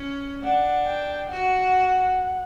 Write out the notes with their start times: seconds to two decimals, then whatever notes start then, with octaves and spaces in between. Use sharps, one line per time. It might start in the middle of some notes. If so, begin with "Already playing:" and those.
Already playing: C#4
0.42 D4 F#5
0.86 G5
1.29 F#4 F#5